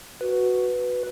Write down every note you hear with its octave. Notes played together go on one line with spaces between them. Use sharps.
F#4 B4